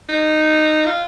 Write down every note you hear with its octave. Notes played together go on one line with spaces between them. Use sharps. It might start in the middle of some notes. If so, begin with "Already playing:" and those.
D#4
F4